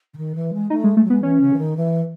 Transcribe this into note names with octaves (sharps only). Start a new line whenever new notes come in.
C#3
D#3
E3
G#3
A3 D#4
G#3
G#3 A3
F#3
G#3 B3
E3 C#4
C#3
E3
D#3
E3